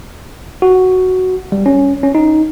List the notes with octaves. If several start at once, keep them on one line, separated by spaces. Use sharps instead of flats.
F#4
G3
C#4
C#4
D#4